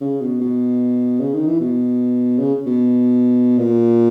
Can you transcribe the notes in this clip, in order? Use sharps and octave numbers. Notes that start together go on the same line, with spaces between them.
C#3
B2
B2
C#3
D#3
E3
B2
C#3
B2
A#2